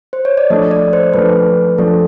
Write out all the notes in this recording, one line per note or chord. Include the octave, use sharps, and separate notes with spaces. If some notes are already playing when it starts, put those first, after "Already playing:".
C5
C#5
D5
F3 A3 D4 D#5
D5
C5
F3 A3 D4 B4
F3 A3 D4 A4